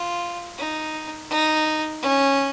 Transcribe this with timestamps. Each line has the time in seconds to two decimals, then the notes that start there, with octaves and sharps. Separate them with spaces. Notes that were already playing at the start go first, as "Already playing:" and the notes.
Already playing: F4
0.58 D#4
1.30 D#4
2.02 C#4